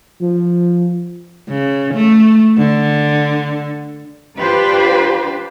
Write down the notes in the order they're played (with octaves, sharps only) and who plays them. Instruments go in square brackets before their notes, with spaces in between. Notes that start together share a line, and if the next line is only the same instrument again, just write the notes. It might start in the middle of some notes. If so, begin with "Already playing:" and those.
[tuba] F3
[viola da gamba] C#3
A3
D3
[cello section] D4 F4 G4 B4 C5